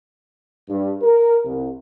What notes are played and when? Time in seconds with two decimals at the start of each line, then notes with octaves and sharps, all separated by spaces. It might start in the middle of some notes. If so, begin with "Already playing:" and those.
0.69 G2
1.02 A#4
1.45 C2